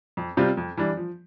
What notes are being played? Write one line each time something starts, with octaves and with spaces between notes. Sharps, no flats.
F2
C3 G3 C4 F4
F2
E3 G3 D4
F3